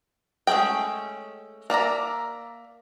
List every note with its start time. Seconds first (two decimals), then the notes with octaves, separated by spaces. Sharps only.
0.47 G#3 A3 C#4 G#4 G5
1.70 A#3 D5 E5 A#5